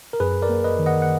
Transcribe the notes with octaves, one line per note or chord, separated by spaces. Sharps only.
A#4
F#2 G#4 B4
A#4 D5
A#3
B4 D#5
D#3
D#5 F#5
F#5